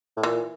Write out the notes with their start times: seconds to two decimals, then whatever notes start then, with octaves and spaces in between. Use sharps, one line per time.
0.17 A2
0.23 A#2 E3